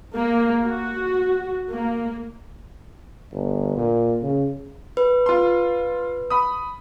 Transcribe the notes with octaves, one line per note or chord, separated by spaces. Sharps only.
A#3
F#4
A#3
G1
A#2
C#3
B4
F4 C6
B5 D#6